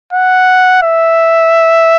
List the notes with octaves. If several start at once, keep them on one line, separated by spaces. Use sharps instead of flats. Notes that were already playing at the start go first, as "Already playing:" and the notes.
F#5
E5